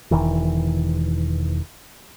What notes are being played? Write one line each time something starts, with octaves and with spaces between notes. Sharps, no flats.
E1 D#3 E3